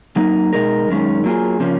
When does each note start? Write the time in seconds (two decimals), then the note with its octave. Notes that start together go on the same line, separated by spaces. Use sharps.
0.16 F#3 A#3 D#4
0.53 B2 G#3 D#4 A#4
0.88 F#2 D#3 G#3 C#4
1.24 F#3 A#3 F4 G#4
1.60 C#3 F3 A#3 C#4